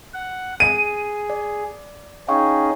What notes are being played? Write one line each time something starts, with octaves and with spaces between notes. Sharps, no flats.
F#5
G#4 D#7
D5
C#4 D#4 G#4 F5 G5 C#6